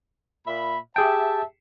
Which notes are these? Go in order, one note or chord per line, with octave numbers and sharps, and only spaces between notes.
A#2 E5 B5
G4 G#4 E5 G5 A5